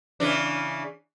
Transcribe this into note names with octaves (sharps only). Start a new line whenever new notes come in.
C#3 E3 D4